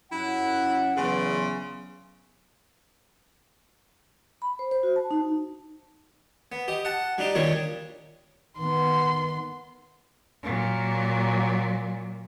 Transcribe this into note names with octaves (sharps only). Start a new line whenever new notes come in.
F#2 E4 F#5
E2 C#3 F#3 B3 C6
B5
C5
C5
F#4
A5
D#4
B3
G4 D#5
F#5 A5
G3 D4 D#4 G4
A#2 D#3 G3 D4 C#5 D#5
D#3 B3 C6
A#2 F#3